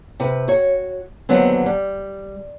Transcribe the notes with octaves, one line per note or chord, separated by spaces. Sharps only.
C3 B4
F#4 C#5
D#2 A2 D3 F#3 B3 C4
G3